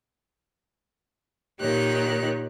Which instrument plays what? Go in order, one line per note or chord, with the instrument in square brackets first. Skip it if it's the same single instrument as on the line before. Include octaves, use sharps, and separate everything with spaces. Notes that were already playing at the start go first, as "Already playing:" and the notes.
[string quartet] A#2 D#3 D#4 G4 C#5 F#6